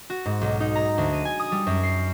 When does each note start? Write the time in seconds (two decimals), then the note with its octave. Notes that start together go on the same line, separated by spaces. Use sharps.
0.10 F#4
0.26 G#2
0.41 B1
0.60 D#4
0.75 A#5
0.98 D2
1.13 D#7
1.25 G#5
1.40 D#6
1.52 G3
1.67 F#2
1.83 C7